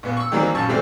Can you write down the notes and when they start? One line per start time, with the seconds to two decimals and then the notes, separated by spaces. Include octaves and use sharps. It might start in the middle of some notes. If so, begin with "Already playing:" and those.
0.03 A#1 B3
0.17 C#6 E6
0.32 D#3 E3 F#3 G3 A#3 C4
0.55 A#1 F#2 A5 C#6
0.68 C3 E3 G3 A3 C4